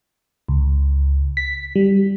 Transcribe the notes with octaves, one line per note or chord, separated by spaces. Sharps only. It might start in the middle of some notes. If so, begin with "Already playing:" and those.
C#2
B6
G3